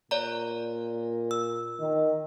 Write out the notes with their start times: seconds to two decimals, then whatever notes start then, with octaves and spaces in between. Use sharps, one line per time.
0.11 A#2 C#5 D5 A#5
1.31 E6
1.80 D#3